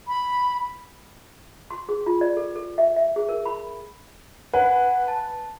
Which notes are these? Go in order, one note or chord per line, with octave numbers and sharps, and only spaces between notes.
B5
C6
G#4
F4
D5
A4
A4
E5
E5
G#4
A#4
B5
B4 F#5 G#5
A5